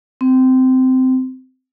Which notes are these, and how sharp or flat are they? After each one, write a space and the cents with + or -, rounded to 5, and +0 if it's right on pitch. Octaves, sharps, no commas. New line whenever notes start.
C4 -15